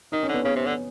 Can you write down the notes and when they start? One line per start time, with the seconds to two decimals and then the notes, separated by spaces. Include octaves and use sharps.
0.12 D#3 D#4
0.23 C#4
0.28 D3
0.34 B3
0.44 C#3 B3
0.56 C3
0.66 D3